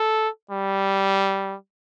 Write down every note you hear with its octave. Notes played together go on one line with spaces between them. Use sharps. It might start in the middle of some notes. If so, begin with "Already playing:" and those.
Already playing: A4
G3